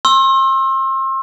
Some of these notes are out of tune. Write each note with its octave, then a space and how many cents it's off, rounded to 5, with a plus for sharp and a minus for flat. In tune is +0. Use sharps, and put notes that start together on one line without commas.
C6 +35 E6 +0